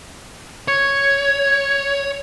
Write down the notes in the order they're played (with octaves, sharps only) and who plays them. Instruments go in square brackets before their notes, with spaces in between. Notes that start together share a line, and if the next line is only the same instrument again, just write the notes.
[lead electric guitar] C#5 [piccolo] G#6